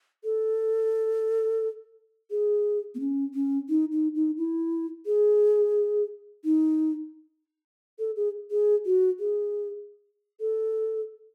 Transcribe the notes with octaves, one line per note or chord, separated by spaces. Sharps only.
A4
G#4
B3
C#4
C#4
D#4
D#4
D#4
E4
G#4
D#4
A4
G#4
G#4
F#4
G#4
A4